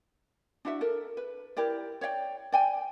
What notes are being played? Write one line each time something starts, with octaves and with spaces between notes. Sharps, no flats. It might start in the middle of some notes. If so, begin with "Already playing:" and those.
D4 E4 F#4 E5
A4 A#4
B4
E4 G4 A#4 D5
C#5 D5 F5 G5
D5 G5 G#5